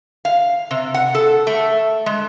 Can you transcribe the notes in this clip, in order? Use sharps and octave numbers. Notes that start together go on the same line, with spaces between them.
F5
C3
F#5
A4
A3
G#3